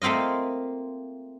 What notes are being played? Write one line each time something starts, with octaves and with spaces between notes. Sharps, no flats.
A3 A#3 C4 F4 D#5